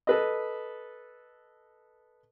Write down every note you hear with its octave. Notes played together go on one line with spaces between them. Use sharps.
A4 B4 D#5